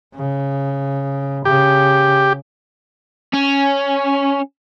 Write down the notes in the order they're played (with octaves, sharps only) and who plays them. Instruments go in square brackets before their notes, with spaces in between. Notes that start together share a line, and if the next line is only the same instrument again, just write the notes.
[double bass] C#3
[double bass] C#3 [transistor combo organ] G4
[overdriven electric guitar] C#4